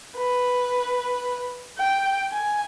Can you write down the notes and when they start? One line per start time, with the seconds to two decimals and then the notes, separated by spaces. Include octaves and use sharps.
0.16 B4
1.78 G5
2.32 G#5